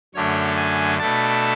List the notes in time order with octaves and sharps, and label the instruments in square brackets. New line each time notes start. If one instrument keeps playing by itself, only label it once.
[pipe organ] F#2 D3 A3 D4 C#5
G#5
B2 A3 D4 A5